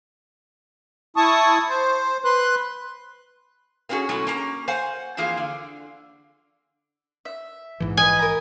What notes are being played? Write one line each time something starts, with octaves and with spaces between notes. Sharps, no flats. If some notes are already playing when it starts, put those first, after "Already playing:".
E4 A5 C#6 D#6
C5
B4 C6 F#6
A#3 C4 C#4 F#4 G#4 A4
B2 F#3 G#3 A3 C#4 E4
A#3 C#4 A#5
C5 F5 F#5 G#5
F2 E3 A#3 F4 G#4 F5
D3
E5
A#1 G#2 E3
B4 D#5 G#5
A#4 A#5